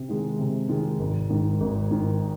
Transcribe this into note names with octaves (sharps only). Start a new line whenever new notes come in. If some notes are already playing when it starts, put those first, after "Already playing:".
Already playing: C3
D#3 G#3
C3
D#3 G#3
G#1
G#2 D#3
G#1
G#2 D#3